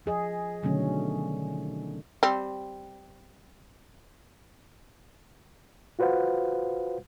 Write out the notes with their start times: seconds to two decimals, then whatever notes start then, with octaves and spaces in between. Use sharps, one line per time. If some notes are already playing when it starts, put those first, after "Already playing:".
0.06 F3 G#4 D#5
0.63 B2 D3 D#3 F#3 A3 C#4
2.23 G3 C4
5.99 F4 F#4 B4 C5 F5 F#5